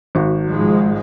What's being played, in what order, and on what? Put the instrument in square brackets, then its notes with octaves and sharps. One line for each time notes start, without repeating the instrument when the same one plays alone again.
[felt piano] G#1 F#4
[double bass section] G#2 F3 G#3